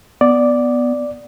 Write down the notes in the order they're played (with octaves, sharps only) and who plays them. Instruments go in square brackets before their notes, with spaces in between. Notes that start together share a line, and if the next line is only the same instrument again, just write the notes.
[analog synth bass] B3 [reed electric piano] D5